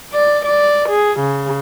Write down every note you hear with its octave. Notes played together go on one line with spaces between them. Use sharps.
D5
D5
G#4
C#3